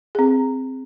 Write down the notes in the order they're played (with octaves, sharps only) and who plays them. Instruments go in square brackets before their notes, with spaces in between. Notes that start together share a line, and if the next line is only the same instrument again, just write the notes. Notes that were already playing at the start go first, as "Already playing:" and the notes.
[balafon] C4 G#4